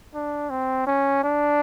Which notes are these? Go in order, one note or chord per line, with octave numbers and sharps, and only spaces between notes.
D4
C4
C#4
D4